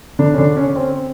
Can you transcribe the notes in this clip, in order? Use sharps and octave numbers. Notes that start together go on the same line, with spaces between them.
D3 D4
C#4
D3 D4
C#4
C4